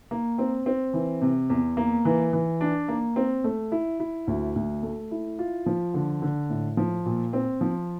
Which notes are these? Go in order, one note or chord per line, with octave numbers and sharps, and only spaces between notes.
A#3
C4
C4
E3
C3
E2
A#3
E3
E3
D4
A#3
C4
A3
E4
E4
D2
D2
A3
E4
F4
F3
D3
D3
A2
F3
A#2
C4
F3